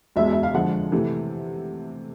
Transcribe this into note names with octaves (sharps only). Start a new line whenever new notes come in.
E1 E2 B2 G#3 E5
E5
F5
F2 D3 F3 G#3 F#5
C3 E3 A3